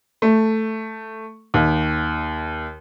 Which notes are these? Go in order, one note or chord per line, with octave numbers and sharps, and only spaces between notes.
A3
D#2